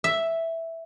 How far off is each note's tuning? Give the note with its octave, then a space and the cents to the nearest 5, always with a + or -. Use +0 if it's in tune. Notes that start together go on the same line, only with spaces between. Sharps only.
E5 +0